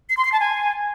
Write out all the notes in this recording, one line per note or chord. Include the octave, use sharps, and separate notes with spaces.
C7
C6
C7
A5
G#5